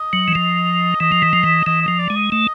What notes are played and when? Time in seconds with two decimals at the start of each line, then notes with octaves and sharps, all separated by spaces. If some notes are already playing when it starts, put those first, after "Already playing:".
Already playing: D#5
0.13 F#3
0.28 E3
0.35 F3
1.00 E3 D#5
1.12 F3
1.22 E3
1.33 F3
1.43 E3
1.66 E3 D#5
1.82 D#5
1.88 F3
1.99 D5
2.10 G#3
2.16 D#5
2.31 A3 D#5